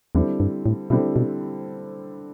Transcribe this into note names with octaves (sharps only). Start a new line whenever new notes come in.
E2 D3 G3 C4 E4
G2
A2
B2 D3 G3 C4 E4
B2